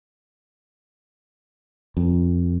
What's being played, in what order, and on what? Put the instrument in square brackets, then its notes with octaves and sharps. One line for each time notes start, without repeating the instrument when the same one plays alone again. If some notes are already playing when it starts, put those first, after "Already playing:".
[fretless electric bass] F2